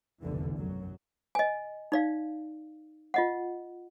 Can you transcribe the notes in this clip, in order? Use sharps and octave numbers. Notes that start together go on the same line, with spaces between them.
F1 B1 E2 G2 D3 E3
F#2 F#3
D#5 G#5
D#4 D5 F5
F4 D#5 F#5